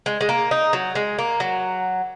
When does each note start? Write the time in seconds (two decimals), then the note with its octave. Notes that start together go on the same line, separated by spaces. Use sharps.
0.06 G#3
0.21 G#3
0.29 A#3
0.51 D#4
0.73 F#3
0.95 G#3
1.18 A#3
1.40 F#3